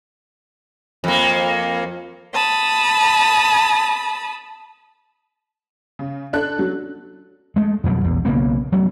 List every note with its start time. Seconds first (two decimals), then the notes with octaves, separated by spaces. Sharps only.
1.04 F2 A#3
2.34 A5 B5 D#6
5.99 C#3
6.33 D4 A4 F#6
6.59 F#3
7.56 G#3 A3
7.84 F2 B2 F#3 G3
8.04 A#1 E2
8.25 B1 C#3 A#3 B3
8.72 F#3 A3 B3 C#4